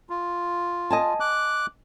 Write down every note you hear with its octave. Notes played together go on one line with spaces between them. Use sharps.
F4
D#5 G#5 A5
D6 F#6